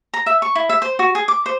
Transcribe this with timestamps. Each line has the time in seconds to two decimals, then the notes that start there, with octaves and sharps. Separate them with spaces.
0.14 A#5
0.26 E5
0.42 C#6
0.55 E4
0.69 E5
0.82 C5
0.99 F#4
1.15 G#4
1.28 D6
1.46 C5